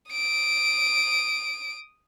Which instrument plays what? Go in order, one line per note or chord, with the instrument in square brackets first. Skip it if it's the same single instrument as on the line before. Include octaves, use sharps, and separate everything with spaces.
[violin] D#6 D7